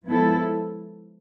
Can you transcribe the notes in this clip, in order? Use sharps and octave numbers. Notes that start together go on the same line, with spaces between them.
F3 G#3 B3 E4 A4